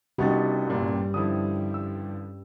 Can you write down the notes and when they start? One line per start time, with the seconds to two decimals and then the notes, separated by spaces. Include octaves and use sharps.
0.18 C2 B3 C#4 D#4 F#4 G4 A6
0.67 A1 G2 A#2 G3
1.14 D3 F3 E4 D#6
1.74 E6